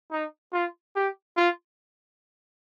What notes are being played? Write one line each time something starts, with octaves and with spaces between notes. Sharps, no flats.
D#4
F4
G4
F4